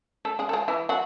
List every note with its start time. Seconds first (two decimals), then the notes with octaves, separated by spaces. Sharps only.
0.25 A3 A4
0.39 G#3 G#4
0.49 A4
0.53 G#3 G#4
0.68 E3 E4
0.89 F#3 F#4